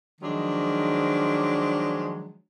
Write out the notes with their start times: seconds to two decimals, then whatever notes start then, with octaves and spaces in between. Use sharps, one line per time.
0.21 D#3 F3 F#3 G#3 D4